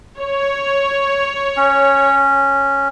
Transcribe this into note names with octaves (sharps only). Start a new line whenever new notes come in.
C#5
C#4